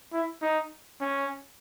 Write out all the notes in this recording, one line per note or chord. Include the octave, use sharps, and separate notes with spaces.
E4
D#4
C#4